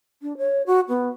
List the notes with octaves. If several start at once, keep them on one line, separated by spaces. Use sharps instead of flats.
D4
C#5
F#4
B3